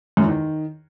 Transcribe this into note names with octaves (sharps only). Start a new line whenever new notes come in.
F#2
E2
D#3